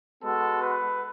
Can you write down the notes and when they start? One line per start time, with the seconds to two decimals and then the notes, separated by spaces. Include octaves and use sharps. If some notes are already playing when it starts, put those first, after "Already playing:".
0.23 G#3 B3 F#4 A4
0.62 B4